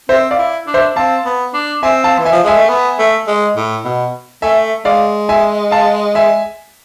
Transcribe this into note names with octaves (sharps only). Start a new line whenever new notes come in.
C4 C5 E5
D5 F5
E4
D4
C5 E5
C4 F5 A5
B3
D4
C4 E5 G#5
F5 A5
E3
E5 G#5
F3
G#3 E5 G#5
A3
B3
A3
G#3
A2
B2
A3 E5 G#5
G#3 D5 F5
E5 G#5
F5 A5
E5 G#5